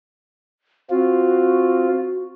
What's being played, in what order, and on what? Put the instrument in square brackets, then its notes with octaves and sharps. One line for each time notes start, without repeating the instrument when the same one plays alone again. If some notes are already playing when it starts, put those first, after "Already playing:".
[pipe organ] C4 F4 [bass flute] F#4